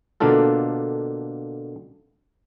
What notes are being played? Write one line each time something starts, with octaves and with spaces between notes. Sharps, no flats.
B2 D3 A#3 D4 F4 A4